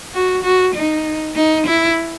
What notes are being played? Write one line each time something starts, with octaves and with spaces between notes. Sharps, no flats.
F#4
F#4
D#4
D#4
E4